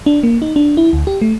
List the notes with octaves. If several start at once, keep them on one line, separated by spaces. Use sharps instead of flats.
D4
A#3
D#4
D4
E4
D2
G4
A3